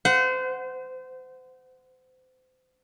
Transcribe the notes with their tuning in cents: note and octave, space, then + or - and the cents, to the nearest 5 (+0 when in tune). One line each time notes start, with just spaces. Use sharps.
C5 -30 F#5 +0